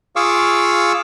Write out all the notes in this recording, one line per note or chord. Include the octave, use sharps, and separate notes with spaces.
F4 G#4 F5 C#6 D6 E6